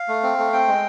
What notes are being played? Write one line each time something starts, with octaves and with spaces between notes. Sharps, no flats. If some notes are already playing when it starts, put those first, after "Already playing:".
Already playing: F5
A3
C4
A3
C4 G5
G#3